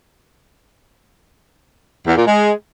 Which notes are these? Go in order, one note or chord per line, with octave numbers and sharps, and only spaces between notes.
E2
A#2
G#3